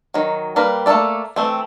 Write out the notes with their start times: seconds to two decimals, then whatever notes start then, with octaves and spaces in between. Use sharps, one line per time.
0.14 D#3 F#3
0.56 G3 A#3 A#4 B4
0.86 A3 A#3 D#4 A4 D5
1.36 E3 A3 C4